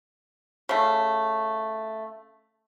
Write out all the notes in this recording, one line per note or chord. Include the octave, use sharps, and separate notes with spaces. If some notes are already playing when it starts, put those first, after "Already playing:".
C#3 A3